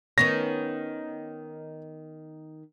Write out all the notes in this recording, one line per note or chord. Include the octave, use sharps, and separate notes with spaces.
D#3 B3 C#4 A#6